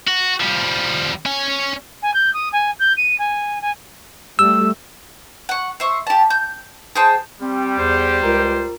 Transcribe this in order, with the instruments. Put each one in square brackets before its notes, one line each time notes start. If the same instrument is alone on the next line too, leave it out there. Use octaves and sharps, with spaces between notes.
[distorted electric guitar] F#4
F3 G3
C#4 G#5
[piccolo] G#5
G6
D#6
G#5
G6
D#7
G#5
G#5
[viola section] G3 A3 [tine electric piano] E6
[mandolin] F#5 C#6
C5 E5 C#6
G4 A5
G6
G#4 C5 G5 A5
[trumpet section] G3 G4 [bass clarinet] C4
[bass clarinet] E2 [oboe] C5
[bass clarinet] C#2 [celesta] F4 A#4 A#5